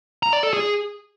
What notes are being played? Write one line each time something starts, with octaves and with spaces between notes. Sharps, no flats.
A#5
D5
A4
G#4